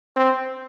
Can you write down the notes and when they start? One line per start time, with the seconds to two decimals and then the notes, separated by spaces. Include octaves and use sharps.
0.16 C4